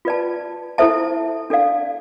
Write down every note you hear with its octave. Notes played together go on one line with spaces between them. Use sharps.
F4 B4 D5 A5
E4 A4 C5 E5 A5
D4 A4 D5 F5